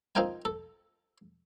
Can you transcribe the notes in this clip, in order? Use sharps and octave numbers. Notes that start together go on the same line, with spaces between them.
C4 D#4 F4 A#4 G5 G#5
A4